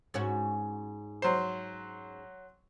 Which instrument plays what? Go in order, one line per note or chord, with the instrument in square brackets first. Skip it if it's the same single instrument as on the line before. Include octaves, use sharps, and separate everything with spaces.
[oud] G#2 C#4 F#4
[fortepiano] F#3 C5